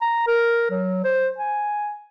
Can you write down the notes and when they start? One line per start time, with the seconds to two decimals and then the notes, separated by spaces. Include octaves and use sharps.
0.02 A#5
0.27 A#4
0.71 F#3
1.04 C5
1.38 G#5